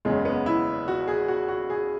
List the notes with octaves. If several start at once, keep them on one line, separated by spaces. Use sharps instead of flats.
F#1 E2 C#3 G#3
B3
E4
F#4
G#4
F#4
F#4
G#4